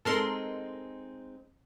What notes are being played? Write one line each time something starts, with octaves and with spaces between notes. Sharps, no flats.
G#3 C4 D#4 A4 A#4 C6